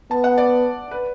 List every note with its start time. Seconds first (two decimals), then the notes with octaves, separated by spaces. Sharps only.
0.11 B3 A5
0.24 F#5
0.38 D5
0.91 B4